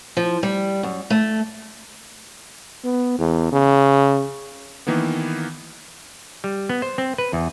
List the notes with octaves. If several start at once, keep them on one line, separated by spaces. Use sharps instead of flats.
F3
G3
F#2
A3
B3
E2
C#3
D#3 E3 A#3 B3
G3
B3
C5
C4
B4
E2